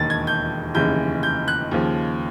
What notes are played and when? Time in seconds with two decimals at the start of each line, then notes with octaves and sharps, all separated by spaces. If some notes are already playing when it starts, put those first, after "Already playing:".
Already playing: E1 D#2 D#3 A6
0.10 G#6
0.27 G6
0.74 F1 D#2 C#3 E3 G6
1.23 G6
1.48 F#6
1.71 D#2 C#3 F3